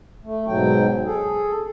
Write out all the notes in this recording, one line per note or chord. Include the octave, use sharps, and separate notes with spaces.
A3
G#2 B2 F#3 G5
G#4 A4